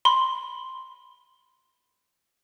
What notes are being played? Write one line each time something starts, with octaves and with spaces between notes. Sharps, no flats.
B5 C6